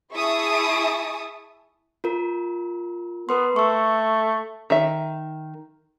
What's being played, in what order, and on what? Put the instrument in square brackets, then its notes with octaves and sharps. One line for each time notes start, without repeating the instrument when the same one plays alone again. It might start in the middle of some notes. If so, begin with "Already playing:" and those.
[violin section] E4 G#4 E5 A5 C#6 D#6
[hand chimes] F4 A#4
[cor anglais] B3 [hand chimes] A#4 B4 C6
[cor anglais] A3 [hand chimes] C#6 E6
[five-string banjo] D#3 E5